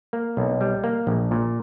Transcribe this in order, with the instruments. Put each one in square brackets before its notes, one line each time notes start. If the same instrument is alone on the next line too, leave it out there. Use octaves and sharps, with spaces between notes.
[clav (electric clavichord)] A#3
B1
G3
A#3
A#1
A#2